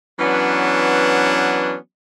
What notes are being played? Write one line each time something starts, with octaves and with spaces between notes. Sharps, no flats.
E3 F#3 B3 C#4 D4